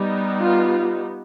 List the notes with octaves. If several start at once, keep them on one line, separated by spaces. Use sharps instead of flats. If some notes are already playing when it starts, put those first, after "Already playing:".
Already playing: G3 B3 D#4
F4